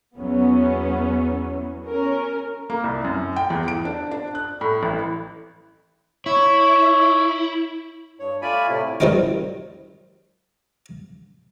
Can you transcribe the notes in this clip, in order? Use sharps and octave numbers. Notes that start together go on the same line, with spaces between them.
E2 F#3 B3 C#4
C#4 A#4
A#3
C2
F#2
G5
E2
D7
D4
D4
F#6
A2
A1
E4 C#5
G2 C#5
A3 F4 D5 G#5 B5
A2 C3 A3 E4
F#2 E3 G3 G#3 C4 C#4